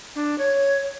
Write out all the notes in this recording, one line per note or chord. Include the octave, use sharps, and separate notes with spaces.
D4
C#5